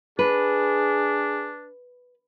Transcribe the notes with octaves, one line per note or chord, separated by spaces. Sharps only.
D4 G#4 B4